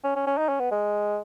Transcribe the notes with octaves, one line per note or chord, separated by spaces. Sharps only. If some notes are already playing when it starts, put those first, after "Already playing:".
C#4
C#4
C#4
D#4
C#4
B3
G#3